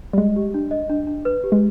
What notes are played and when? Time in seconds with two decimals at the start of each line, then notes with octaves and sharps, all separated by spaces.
0.13 G3
0.17 G#3 D#5
0.36 G4
0.54 D4
0.71 D#5
0.90 D4
1.07 D4
1.25 B4
1.44 G4
1.52 G#3